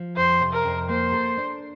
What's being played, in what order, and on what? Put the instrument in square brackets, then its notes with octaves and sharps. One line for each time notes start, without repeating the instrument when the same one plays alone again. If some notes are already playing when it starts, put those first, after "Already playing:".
Already playing: [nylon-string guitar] F3
[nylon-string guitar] F2 [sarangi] C5
[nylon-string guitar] C3
[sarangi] A#4
[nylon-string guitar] F2
[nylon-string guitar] A#3 [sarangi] C5
[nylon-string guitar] A4
D4